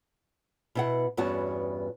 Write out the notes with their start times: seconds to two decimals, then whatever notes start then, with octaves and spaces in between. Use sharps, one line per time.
0.75 B2 E4 F#5
1.17 E2 G2 B3 C#4 F#4 A5